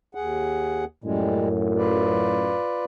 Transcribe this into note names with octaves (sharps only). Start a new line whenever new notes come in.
D#2 G#4 F#5
F#2 A2 G3 G#3
F4 B4 D5